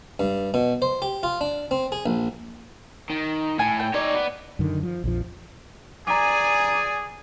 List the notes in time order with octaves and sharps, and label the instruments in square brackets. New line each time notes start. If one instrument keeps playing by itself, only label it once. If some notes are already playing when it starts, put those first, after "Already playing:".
[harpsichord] G2
B2
C5
G4
F4
D4
C4
G#4
A#1
[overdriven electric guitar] D#3
[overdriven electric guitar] A2 [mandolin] G#5
[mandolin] G5
[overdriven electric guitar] D#4 C#5 [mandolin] D5
[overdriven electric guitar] B3
[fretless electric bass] F#2 D3 D#3
F3
A#1 F2 F3
[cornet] G#4 [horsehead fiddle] D5 G#5 [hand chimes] A#5 D6